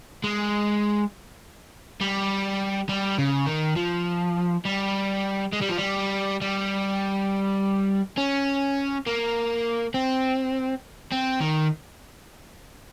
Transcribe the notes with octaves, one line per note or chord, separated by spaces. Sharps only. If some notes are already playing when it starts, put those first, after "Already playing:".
G#3
G3
G3
C#3
D#3
F3
G3
G#3
G3
F3
G3
G3
C#4
A#3
C4
C4
D#3